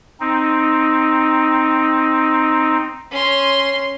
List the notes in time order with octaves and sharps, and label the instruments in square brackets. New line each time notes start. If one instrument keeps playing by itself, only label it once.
[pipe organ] C4 D#4
[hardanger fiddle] C#4 C6